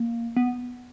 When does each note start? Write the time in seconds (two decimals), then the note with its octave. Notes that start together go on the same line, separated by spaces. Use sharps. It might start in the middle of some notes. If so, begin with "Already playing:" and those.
Already playing: A#3
0.37 B3